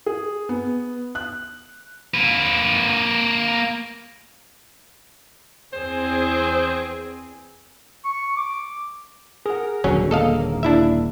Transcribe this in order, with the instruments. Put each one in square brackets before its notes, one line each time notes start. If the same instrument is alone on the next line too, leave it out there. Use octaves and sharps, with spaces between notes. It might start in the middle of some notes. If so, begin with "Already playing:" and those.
[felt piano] G#4
B3
F#6
[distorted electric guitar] A#3 B4
[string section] E2 C4 G#4 [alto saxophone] C5
[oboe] C#6
D6
[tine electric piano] G#4 F#5 [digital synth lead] A#4
[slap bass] D#1 D3 [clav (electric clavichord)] F#3 C#4
[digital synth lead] A#3 [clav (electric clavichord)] A4 D#5 F5
[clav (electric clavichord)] D4 E4 E5